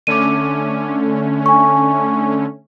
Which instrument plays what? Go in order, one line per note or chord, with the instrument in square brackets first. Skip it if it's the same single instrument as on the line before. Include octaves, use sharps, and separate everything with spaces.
[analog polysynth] D3 A3 C#4 [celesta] D6 D#7
[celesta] G#5 C#6